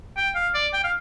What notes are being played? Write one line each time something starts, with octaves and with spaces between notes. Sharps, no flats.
G5
F5
D5
G5
F5